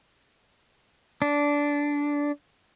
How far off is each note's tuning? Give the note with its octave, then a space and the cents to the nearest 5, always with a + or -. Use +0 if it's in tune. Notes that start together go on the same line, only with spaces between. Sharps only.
D4 -15